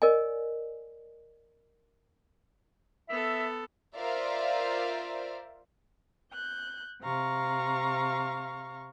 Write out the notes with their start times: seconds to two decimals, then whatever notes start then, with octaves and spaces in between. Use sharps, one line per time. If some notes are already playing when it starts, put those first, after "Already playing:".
0.02 A#4 D5 D#5 G#5
3.09 B3 A4 E5
3.97 F4 A#4 C5 D5 E5 F5
6.33 F#6 G6
7.02 C3 F5 A#5 C#6